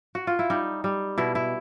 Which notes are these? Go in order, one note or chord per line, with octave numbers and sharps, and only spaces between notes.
F#4
F4
E4
G3 D#4
G3
B2 E4
E4